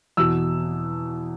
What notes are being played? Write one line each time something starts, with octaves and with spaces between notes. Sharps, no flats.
E2 B2 E6